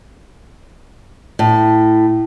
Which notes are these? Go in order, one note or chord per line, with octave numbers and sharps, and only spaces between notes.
A2